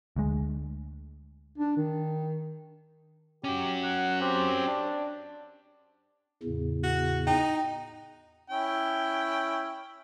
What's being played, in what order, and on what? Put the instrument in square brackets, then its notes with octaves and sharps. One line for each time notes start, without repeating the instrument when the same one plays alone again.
[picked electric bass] D2 G#3
[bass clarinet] D4
D#3
[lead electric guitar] C#4 F#4 [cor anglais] G4
[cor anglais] F#5
[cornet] C4 [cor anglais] G4
[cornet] D4
[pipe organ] E2 A2 C#3
[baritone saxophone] F#4
[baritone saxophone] D#4 [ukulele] G5
[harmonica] C#4 E4 G5